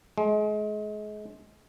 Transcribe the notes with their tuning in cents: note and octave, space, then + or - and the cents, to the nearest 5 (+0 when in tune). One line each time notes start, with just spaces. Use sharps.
G#3 +30